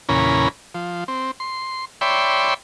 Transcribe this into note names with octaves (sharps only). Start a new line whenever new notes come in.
E2 A#2 C#3 C#4 A#5 B5
F3
C4
C6
C#5 D5 E5 G5 B5 C6